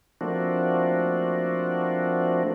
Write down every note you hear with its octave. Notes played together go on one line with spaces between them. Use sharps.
F3 A3 A#3 C4 D4 F#4